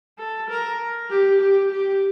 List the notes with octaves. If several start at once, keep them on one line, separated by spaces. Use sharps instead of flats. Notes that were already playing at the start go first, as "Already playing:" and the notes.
A4
A#4
G4
G4
G4